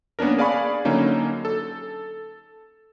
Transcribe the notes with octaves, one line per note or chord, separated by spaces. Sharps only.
A#3 B3 C#4 D4 A#4
G#4 D5 F5 G#5 B5 C#6
D3 F#3 A#3 C#4 D#4
A4